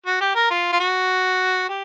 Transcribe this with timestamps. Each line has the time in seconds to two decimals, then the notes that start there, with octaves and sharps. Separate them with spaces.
0.06 F#4
0.21 G4
0.35 A#4
0.50 F4
0.72 F4
0.80 F#4
1.69 G4